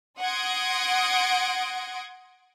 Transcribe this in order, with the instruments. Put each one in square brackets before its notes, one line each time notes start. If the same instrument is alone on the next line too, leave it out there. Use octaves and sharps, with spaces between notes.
[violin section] F#5 C6 D#6 G#6 A#6 D7